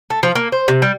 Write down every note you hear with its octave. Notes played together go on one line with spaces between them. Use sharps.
A3
F3
A#3
C5
C3
G3